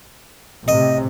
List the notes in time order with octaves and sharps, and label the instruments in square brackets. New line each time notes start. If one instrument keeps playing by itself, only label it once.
[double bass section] A2 C3 [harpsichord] D#5